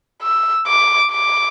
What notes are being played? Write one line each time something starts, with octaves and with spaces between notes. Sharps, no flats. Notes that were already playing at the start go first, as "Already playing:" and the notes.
E6
D6
D6